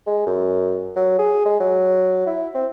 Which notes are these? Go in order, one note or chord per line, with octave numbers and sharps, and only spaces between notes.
G#3
F#2
F#3
G#4
G#3
F#3
E4
C4